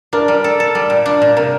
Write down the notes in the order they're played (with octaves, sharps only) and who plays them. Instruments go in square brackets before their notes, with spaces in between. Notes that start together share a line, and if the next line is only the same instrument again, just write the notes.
[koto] D4 [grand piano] A#4
[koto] G3
A4
A4
G3
A#2
D4
A#2
[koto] C3 [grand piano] A#4